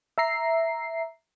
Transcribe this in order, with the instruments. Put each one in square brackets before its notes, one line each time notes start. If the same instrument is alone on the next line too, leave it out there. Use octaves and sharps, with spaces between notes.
[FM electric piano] E5 A#5 C7